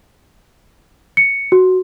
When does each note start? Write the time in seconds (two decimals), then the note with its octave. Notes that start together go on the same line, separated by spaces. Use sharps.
1.17 C#7
1.52 F#4